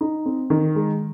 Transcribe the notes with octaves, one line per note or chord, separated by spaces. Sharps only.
D#4
C4
D#3
G#3